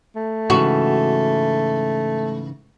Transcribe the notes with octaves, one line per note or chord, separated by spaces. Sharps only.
A3
G#2 C#3 E3 F#4